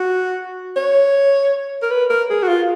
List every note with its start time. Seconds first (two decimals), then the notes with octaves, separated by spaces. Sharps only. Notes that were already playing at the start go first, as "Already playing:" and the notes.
Already playing: F#4
0.76 C#5
1.82 A#4
1.91 B4
2.10 A#4
2.30 G#4
2.43 F#4
2.48 F4